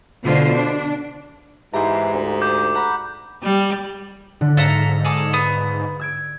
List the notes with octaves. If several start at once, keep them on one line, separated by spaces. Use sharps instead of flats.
B2 D3 F4 C5
D4
G#2 E3 G4 C5 A#5
D2
D6 G6
F#5 A#5 B5
G3
D3 D4
G#2 A4 E5 F5 A#5 C#7
G#2 G#4 A4 D6
B3
E6 G#6 D7